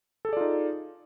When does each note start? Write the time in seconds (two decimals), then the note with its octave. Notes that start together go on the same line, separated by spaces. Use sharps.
0.25 A4
0.29 G#4
0.33 D5
0.37 F4
0.41 D#4